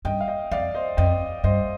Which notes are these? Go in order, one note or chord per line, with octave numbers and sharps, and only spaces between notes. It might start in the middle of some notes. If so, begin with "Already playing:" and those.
G2 D#5 G5
F5
D#5 G5
F2 D5 F5
C5 D#5
F2 D#5 G5
G2 C5 D#5